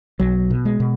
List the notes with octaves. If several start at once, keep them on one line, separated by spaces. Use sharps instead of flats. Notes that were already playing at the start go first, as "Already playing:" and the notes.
B1 F#3
B2
G#3
B2